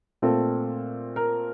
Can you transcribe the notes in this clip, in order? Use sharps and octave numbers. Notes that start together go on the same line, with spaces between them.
A#2 A3 C4 A4
A#4